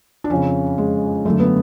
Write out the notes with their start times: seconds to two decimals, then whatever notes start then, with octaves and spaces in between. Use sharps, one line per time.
0.24 D4
0.30 F2 C#3 C#4
0.78 G#3
1.25 F#2 D3 A3
1.39 B3